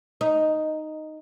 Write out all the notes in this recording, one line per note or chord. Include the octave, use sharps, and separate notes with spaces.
D#4